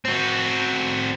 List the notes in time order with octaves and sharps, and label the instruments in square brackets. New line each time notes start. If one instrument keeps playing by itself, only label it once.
[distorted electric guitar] C4 F#4